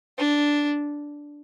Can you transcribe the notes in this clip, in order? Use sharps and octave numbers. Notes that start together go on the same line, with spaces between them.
D4